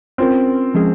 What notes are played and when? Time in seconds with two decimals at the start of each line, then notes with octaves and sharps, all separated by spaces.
0.18 C4 C#4 F4 A#4
0.74 F3 G#3 C#4 G#4